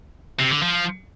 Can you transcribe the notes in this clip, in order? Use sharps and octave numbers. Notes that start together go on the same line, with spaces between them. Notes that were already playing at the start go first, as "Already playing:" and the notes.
C3
D3
F3